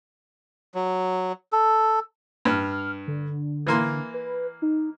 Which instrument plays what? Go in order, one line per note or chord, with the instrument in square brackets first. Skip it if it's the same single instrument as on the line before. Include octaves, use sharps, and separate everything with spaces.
[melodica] F#3
A4
[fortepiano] G2 [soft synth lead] F6
[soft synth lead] D3
[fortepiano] E3 A#3 C6
[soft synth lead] B4
D#4